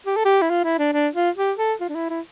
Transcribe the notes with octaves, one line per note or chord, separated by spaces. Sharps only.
G4
A4
G4
E4
F4
E4
D4
D4
F4
G4
A4
F4
D4
E4
E4